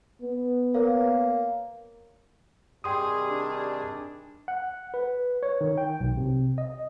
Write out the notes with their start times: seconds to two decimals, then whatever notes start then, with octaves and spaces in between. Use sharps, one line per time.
0.22 B3
0.74 A#3 A#4 C#5 F5
2.84 C3 D#3 G3 G#4 G5 C6 D#6
3.30 D4
4.48 F#5
4.94 B4
5.43 C#5
5.61 D#3
5.78 G5
6.00 B1
6.17 C3
6.58 D#5